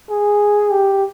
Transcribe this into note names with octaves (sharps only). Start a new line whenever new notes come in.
G#4
G4